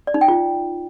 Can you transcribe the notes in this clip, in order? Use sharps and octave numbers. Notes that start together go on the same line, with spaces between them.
D5
D#4
G5
F4